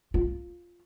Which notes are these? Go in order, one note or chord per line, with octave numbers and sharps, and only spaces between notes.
F4